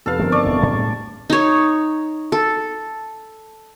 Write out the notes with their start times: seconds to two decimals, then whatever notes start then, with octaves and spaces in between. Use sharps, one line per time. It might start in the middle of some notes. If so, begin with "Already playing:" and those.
0.06 F1 A4 B4 F5
0.19 G1 D#3 F3 G3 C4 A#4
0.32 D5 A5 C#6
0.45 E1 E2
0.59 A2 G3 G#3
1.30 D#4 C#5
2.32 A4